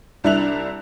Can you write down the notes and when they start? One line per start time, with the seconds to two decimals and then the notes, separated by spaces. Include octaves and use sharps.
0.24 C2 D4 E4 E5 F#6 F7